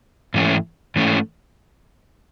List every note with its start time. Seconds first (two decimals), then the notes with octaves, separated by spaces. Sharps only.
0.34 G#2 E3 A3 C#4
0.96 G#2 E3 A3 C#4